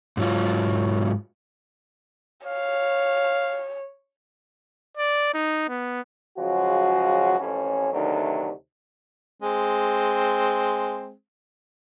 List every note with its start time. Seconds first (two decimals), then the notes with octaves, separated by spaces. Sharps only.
0.17 G#2 F#3 F4
2.47 C#5 F5
4.97 D5
5.34 D#4
5.69 B3
6.38 C#3 F3 F#3 G#3 F#4
7.39 A1 F2 C#4
7.93 D2 C3 D#3 F#3 A3 D4
9.42 G#3 C4